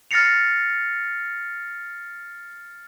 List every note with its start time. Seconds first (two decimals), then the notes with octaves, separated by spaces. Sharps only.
0.11 F6 A6 A#6 C7 C#7 F7